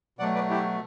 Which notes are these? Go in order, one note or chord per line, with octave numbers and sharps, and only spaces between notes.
B2 F#3 A3 D5 F#5
B4 D5
E4 G4